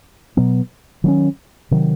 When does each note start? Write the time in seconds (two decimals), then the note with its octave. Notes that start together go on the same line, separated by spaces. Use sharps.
0.37 B2 F#3 B3
1.04 D#3 F#3 A#3 C#4
1.71 C3 D#3 F#3